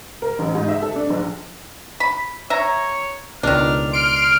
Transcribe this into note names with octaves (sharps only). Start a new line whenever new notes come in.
A#4
A1
G#2
E5
A4
D4
A#1
B5
C#5 E5 A#5
C#2 B2 D#3 D4 F6
C6 F6 D7